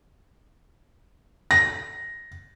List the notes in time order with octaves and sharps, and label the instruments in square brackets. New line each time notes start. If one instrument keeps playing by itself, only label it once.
[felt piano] A#6